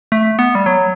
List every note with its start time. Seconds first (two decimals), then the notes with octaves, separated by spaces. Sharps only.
0.12 A3
0.39 B3
0.55 G3
0.66 F#3